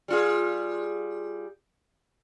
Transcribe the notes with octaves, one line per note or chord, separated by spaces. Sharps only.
G3 F4 G#4